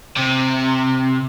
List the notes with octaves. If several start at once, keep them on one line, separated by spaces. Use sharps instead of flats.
C3